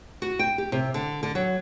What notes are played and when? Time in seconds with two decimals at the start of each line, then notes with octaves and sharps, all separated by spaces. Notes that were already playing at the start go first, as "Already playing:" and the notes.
0.22 F#4
0.39 G5
0.58 G4
0.72 C3
0.94 D3
1.23 D3
1.35 F#3